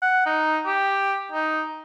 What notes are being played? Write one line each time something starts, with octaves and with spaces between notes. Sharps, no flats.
F#5
D#4
G4
D#4